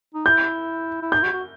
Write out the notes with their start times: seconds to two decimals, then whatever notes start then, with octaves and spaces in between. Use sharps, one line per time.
0.14 D#4
0.26 E4 G6
1.02 E4
1.12 D#4 G6
1.23 F#4
1.33 F#4